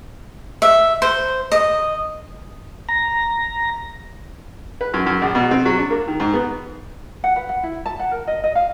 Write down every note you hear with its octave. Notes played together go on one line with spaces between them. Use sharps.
E5
C5
D#5
A#5
B4
F#2
F#2
A#1
B2
C4
F#3
D4
A#3
D#3
G#2
B3
F#5
B4
F#5
E4
A5
F#5
A#4
D#5
D#5
F5